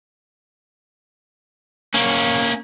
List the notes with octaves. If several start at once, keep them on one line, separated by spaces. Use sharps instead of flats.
A#3 C#4